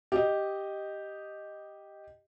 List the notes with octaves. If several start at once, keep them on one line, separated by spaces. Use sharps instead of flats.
G4 D#5